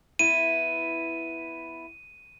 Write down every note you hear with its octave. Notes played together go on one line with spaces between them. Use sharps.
B3 E4 D#7